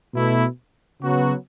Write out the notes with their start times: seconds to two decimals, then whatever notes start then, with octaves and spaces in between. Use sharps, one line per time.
0.13 B2 A3 E4
1.01 C#3 F#3 B3 F#4